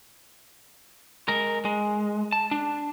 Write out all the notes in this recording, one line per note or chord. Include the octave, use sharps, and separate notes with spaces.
G#3 A#4
G#3
A5
D4